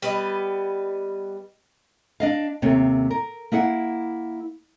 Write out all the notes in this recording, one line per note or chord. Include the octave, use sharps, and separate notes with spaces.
G3 B3 B4 D#5
D4 D#5 F5
D#2 C3 A3 A#3 C#4
A#4
A#3 E4 G#4 F#5